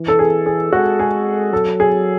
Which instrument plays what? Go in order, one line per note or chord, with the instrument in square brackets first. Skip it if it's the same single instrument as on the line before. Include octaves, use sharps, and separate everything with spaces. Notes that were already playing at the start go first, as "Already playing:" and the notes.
Already playing: [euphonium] E3
[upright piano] A4
G#4
G#4
[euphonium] G#3 [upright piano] F#4
[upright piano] G#4
[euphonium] F#3 [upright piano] A4
[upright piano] G#4